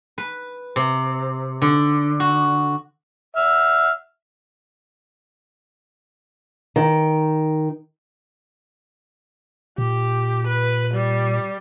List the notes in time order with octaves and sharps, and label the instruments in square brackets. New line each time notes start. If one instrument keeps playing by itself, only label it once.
[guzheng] B4
C3
D3
F#4
[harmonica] E5 F6
[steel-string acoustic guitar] D#3
[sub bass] A#2 [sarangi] G4
[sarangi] B4
G3